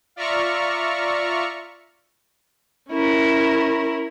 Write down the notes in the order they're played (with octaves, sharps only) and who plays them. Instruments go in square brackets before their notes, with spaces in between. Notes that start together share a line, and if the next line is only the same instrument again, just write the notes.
[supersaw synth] F4 D5 E5 A#5 C#6 F6
[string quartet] C#4 E4 A#4